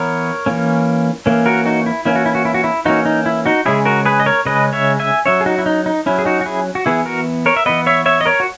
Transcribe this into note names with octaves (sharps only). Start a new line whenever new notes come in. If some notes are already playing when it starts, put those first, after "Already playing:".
Already playing: E3 B3 A#4 C#5
E3 A#3 C#4
E3 A#3 C#4
F#4 A#4
D#4 F#4
E4
E3 A#3 C#4 E4
F#4
E4
F#4
E4
F#4
E4
E3 A#3 C#4 D#4 F#4
D#4
E4
D#4 F#4
C#3 G#3 C#4 E4 G#4
F#4 A#4
G#4 B4
D#5
A#4 C#5
C#3 G#3 C#4 B4 D#5
C#5 E5
E5 G#5
F#3 C#4 C#5 E5
G#4
D#4 F#4
E4
D#4
D#4
F#3 C#4 E4
G#4
D#4 F#4
F#4
E4 G#4
F#4
E3 B3 E4 G#4
F#4 A#4
A#4 C#5
E5
E3 B3 B4 D#5
C#5 E5
C#5 E5
D#5
A#4 C#5
F#4